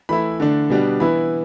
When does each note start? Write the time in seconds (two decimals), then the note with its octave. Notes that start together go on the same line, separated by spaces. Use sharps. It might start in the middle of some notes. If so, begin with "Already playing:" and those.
0.09 E3 A3 E4 B5
0.40 D3 A3 D4
0.70 B2 G3 B3 D4
1.00 E3 B3 E4 B5